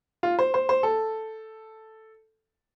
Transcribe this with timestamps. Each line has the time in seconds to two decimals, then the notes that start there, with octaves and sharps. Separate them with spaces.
0.23 F4
0.39 C5
0.54 C5
0.69 C5
0.83 A4